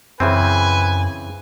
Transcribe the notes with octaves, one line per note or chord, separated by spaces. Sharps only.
F#2 C#3 E3 C4 B4 G#5